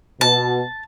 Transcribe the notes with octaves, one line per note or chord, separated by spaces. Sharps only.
B2 A5